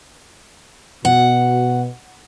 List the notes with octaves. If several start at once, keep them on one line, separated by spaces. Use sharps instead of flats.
B2 F#5